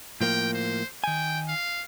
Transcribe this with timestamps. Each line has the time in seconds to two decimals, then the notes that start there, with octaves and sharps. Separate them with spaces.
0.21 A2 F3 A#3 G5
0.53 C5
1.04 D#3 G5 G#5
1.48 F5